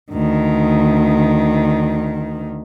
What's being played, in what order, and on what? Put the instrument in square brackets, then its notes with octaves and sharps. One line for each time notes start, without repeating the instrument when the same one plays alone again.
[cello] D2 D#3